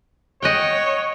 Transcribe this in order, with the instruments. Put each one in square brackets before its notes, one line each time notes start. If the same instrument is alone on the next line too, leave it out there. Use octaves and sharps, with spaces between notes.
[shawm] C#5 [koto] D#5 F#5 G5